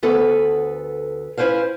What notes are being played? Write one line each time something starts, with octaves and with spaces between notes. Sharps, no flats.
D2 B3 A4 B4
C#4 E4 B4 C5 F5